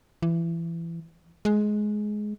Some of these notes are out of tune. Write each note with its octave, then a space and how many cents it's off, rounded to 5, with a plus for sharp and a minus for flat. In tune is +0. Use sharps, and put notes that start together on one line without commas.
E3 +25
G#3 +15